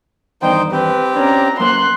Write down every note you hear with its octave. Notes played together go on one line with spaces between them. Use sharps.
E2 G2 D#3 D#4 C5 G5
C4 G4 B4
C#4 D4 A#5
F#2 A#3 C5 C6 F#6